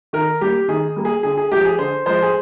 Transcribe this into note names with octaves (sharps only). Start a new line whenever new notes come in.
D#3 A#4
G3 A#3 G4
D#3 G#4
G3 A#3
G#4
D3 G#4
G#4
F3 G#3 G4
G#4
D3 C5
F3 G#3 C5
G#4